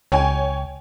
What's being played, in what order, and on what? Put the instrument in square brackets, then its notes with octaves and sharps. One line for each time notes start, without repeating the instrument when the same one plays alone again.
[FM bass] C#2 [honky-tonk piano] C#5 G5 G#5